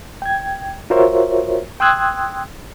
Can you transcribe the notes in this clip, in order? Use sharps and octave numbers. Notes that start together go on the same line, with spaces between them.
G5 G#6
F4 F#4 A#4 C5 C#5 E5
G5 C6 D#6 E6 F#6 G#6